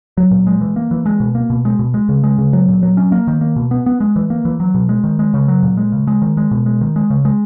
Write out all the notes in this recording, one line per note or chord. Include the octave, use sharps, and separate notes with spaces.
F#3
A#2
G#3
E3
A#3
E3
G#3
B2
A#3
B2
G#3
B2
G#3
C#3
G#3
C#3
F#3
A#2
F#3
C#4
A#3
D#3
A#3
B2
B3
B3
G#3
E3
A#3
E3
F#3
B2
G#3
D#3
G#3
C#3
F#3
A#2
G#3
C#3
G#3
D#3
G#3
B2
G#3
D#3
G#3
C#3
G#3